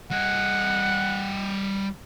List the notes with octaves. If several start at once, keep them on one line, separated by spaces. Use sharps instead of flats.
G3 D#5 F#5